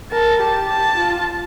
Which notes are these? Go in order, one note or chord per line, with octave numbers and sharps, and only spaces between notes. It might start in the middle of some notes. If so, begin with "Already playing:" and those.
A#4 A5
G4 A5
A5
F4